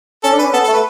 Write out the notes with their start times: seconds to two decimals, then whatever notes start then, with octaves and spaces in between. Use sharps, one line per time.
0.23 C#4 A4
0.33 D4
0.38 B4
0.42 C#4
0.53 B3 A4
0.64 A4
0.68 A3
0.73 B4